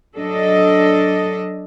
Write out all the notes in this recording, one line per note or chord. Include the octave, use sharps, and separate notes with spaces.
F#3 D4 A4 D#5